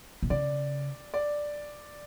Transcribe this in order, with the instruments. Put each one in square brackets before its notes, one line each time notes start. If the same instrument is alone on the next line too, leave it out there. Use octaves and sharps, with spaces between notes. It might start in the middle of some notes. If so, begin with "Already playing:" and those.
[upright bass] A#2
[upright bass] C#3 [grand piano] D5
[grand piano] D5